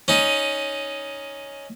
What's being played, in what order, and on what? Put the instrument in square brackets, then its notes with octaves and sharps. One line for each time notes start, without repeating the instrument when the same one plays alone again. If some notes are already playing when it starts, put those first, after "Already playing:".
[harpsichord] C#4 D#4